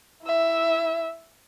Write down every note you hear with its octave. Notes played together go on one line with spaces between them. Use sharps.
E4 E5